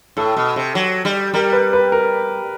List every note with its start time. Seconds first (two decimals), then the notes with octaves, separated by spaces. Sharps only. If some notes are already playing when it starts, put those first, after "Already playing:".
0.17 A2 A4
0.36 B2
0.56 C3
0.75 F#3
1.05 G3
1.33 G3 A#4
1.53 B4
1.73 B4
1.92 A#4